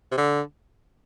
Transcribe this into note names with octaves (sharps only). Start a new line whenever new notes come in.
C3
D3